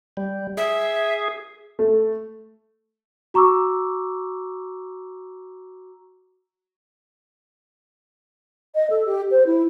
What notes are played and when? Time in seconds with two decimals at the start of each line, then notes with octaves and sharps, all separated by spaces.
0.17 G3
0.57 G#4 E5
1.79 A3
3.34 F#4 A#5 C#6 D6 E6
8.75 D#5
8.90 A4
9.06 G4
9.31 C5
9.46 E4